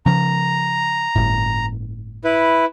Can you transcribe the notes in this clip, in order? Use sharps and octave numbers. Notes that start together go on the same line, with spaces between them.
C#3 F3 A#5
G1 A2
E4 B4